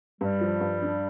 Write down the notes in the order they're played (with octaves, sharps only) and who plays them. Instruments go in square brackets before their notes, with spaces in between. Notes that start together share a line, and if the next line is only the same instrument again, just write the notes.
[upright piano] G2 [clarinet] G3
[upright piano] F3
G2
D4